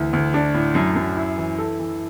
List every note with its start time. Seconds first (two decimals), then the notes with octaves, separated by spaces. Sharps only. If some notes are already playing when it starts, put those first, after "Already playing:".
Already playing: D2 E3
0.13 D2
0.34 D4
0.54 A2
0.75 F#2
0.96 F#2
1.16 E4
1.38 E3
1.58 A4
1.79 E3